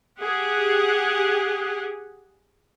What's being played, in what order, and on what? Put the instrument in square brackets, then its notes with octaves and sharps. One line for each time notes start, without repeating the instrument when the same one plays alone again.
[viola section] G4 G#4 F#5